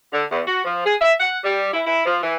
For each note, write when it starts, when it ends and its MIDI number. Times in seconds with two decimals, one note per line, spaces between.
0.13 0.24 50
0.31 0.42 40
0.47 0.60 66
0.64 0.82 53
0.86 0.95 68
1.00 1.13 76
1.20 1.38 78
1.44 1.69 55
1.73 1.81 64
1.86 2.05 64
2.06 2.19 53
2.23 2.36 52